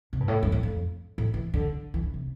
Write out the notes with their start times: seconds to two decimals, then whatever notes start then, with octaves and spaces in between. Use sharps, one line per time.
0.13 C3
0.20 G2
0.28 A2
0.43 G2
0.52 A2
0.63 F2
1.18 A2
1.34 E3
1.54 D3
1.94 E3
2.03 D3
2.14 C3